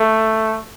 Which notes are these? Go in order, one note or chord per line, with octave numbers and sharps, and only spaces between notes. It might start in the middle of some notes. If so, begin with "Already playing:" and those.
Already playing: A3